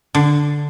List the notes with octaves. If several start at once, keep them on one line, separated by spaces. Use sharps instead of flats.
D3